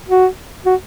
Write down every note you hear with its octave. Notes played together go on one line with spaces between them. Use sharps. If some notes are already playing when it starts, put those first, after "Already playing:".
F#4
F#4